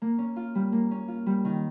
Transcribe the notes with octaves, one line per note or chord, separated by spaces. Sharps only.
A#3
C#4
F4
G3
A#3
C#4
F4
G3
D#3